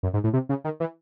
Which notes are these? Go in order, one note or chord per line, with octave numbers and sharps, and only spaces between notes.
F#2
G#2
A2
C3
C#3
D#3
E3